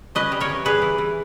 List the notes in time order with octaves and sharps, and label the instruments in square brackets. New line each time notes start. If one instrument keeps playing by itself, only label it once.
[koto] C#4 B4 D#5
G3
A#4 C#5
E3
G3 G#4 B4
E3
E3